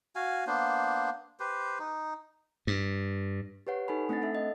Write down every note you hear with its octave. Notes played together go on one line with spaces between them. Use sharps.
F#4 F5 G#5
A#3 B3 D4 C5
G4 B4 C5
D#4
G2
G4 B4 C#5 F#5
D#4 A4 G#5 B5
A3 C4 D4 F#5 A6
A4 E5
D#5